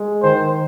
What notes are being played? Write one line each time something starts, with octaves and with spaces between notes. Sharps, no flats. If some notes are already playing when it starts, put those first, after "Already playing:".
Already playing: G#3
D#3 C5